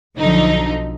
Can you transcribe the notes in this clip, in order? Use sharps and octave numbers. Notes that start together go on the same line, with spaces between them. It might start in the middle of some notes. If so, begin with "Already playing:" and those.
B1 D3 F3 D#4